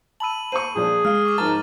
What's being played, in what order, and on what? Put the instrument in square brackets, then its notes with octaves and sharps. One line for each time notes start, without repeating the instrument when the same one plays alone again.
[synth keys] A5 B5 E6 [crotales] D#7 F#7
[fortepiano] C5 A#5 C#6 [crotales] D#7
[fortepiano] A#2 F3 D4 [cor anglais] G#4
[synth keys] G#3 [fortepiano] F5 [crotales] F6
[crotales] C#6 D6 F6
[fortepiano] G#2 F3 A5 [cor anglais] A#4 [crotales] A6